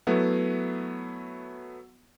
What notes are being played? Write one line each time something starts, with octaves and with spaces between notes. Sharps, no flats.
F#3 A3 B3 E4